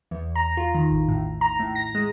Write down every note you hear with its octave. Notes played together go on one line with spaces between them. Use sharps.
E2
A#5
F4
D#3
A1
A2
A#5
A2
A#6
G#3